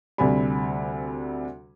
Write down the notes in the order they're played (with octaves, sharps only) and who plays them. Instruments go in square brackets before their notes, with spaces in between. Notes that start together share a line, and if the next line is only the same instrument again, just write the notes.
[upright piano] D2 C3 G3 G#5 B5